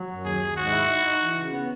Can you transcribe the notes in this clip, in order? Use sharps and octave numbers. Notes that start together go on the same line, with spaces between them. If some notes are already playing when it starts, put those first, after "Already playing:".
Already playing: F#3
F#2
D#2 G#4
D#2
G#2 F#4
E4
D#4
D#4
E3
C#3
B3